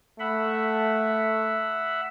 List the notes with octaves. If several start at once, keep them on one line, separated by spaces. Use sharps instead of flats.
A3 E5 F#5 B5